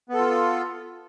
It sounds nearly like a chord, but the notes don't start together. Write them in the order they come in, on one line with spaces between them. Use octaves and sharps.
B3 A4 F4